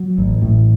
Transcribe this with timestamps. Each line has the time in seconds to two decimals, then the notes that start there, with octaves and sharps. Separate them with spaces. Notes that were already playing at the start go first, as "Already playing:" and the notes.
Already playing: F#3
0.18 A1
0.42 A2